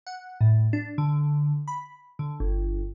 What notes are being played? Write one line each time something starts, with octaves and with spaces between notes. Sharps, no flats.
F#5
A2
D4
D3
B5
D3
G1